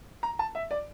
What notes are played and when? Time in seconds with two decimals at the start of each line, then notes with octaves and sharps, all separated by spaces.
0.23 A#5
0.39 A5
0.55 E5
0.71 D5